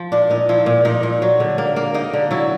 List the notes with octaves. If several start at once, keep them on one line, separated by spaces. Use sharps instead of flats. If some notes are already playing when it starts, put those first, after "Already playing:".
Already playing: F3
A#2 D4
A#2 D#4
F3 E4
A#2
A#2 D#4
A#2
F#3
D3
A#3
A#3
A#3 D#4
D3
F#3 E4